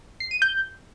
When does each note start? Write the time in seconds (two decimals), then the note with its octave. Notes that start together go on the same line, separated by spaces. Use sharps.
0.20 C7
0.31 D#7
0.42 G6